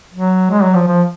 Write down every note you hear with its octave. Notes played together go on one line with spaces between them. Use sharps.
F#3
G#3
F#3
F3
F3